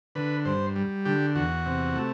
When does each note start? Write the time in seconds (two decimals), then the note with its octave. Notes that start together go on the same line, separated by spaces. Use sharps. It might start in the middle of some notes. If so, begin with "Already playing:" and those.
0.15 D3 B4
0.45 G2 C5
0.76 G3
1.05 D3 G4
1.35 E2 F#4
1.66 C3
1.96 A3